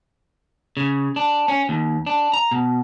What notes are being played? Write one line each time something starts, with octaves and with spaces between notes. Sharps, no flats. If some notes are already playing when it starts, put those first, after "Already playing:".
C#3
D4
C#4
D#2
D4
A#5
B2